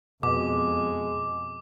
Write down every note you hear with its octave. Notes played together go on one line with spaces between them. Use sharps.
F2 B2 G#3 D6